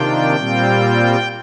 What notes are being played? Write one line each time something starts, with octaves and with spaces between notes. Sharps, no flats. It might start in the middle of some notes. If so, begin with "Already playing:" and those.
Already playing: C3 D#3 A#3 D4 F4 G5
A#2 G3 C4 F4